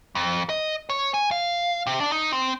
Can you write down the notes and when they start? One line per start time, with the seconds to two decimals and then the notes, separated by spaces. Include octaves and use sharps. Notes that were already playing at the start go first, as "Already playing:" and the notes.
0.15 F2
0.49 D#5
0.89 C#5
1.14 G#5
1.31 F5
1.87 C3
2.00 D4
2.12 D#4
2.32 C4